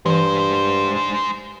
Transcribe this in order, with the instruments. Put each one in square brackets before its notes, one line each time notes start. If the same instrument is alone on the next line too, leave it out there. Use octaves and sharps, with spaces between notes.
[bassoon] G2 [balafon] E3 [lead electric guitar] G#3 C5